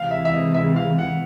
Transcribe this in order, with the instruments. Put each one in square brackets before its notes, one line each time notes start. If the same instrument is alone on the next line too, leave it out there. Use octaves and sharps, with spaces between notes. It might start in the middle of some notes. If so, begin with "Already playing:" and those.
Already playing: [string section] C3 E3 G#3 [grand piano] F5
[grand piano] E5
E5
D#5
E5
F5
F#5